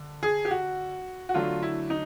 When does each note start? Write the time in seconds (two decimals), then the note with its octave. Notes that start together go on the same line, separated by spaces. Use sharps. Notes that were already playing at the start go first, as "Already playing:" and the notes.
Already playing: D3
0.23 G#4
0.45 G4
0.51 F#4
1.29 F#4
1.34 D3 F#3 A3 D4 F4
1.63 E4
1.90 D#4